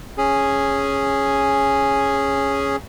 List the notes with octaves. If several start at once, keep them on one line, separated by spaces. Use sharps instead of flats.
C#4 G#4